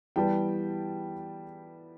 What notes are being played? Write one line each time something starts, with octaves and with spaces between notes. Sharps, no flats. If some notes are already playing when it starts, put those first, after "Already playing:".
E3 G3 B3 G5 A5